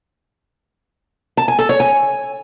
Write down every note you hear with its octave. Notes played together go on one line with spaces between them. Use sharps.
A5
G#5
A4
C#5
G#5